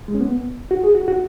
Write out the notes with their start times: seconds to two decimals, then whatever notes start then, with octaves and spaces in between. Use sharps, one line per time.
0.08 G#3
0.14 C#4
0.21 B3
0.71 F#4
0.84 G#4
0.95 F#4
1.08 F#4